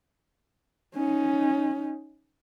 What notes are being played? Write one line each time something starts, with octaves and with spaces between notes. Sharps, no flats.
C#4 D#4